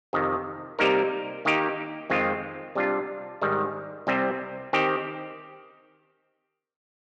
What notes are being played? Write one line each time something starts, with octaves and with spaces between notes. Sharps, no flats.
F2 C3 D#3
C3 G3 A#3 D#4 A#4
D#3 A#3 D#4 G4
F2 D#3 G#3 C4 F4
C3 G3 D4 F4
G#2 D#3 G3
C2 C3 G3 C4
D#3 C4 G4